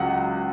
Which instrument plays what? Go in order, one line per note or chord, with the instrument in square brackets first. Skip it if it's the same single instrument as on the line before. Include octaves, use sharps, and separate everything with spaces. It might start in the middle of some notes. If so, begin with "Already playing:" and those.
Already playing: [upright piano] C#2 F#3 F#5